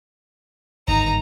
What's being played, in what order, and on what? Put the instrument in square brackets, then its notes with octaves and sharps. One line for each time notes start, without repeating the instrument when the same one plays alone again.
[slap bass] G1 G#2 D#3 [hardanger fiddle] D#4 A#5